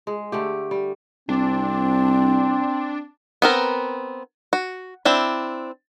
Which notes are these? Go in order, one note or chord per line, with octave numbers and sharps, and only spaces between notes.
G#3
D3 A3 G4
G3
C2 C4 D4
B3 C4 A#4
F#4
C4 D4 E4